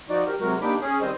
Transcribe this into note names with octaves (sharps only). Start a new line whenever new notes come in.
F3 D#4 F#4 D5
G4 A#4
C3 F#3 G#3 F#4 A#4
A#3 D4 D#4 G4 B5 D6
C#4 G#4
D#3 G3 C4 C5 D#5